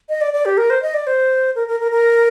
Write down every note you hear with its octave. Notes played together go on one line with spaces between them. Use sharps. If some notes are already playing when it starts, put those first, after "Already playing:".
D#5
D5
D5
G4
A#4
C5
D#5
D5
C5
A#4
A#4
A#4
A#4